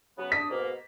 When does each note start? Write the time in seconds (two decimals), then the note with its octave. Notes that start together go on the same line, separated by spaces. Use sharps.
0.18 C#3 F#3 B3
0.32 D4 D#6 B6
0.50 G#2 B2 A#3